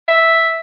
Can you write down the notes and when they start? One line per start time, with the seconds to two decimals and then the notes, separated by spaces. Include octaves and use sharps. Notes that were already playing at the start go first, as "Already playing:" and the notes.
0.08 E5